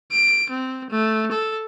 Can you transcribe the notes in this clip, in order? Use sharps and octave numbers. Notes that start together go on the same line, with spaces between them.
D7
C4
A3
A4